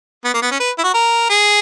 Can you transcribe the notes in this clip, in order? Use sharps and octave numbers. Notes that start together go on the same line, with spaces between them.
B3
A#3
B3
C#4
B4
E4
F#4
A#4
G#4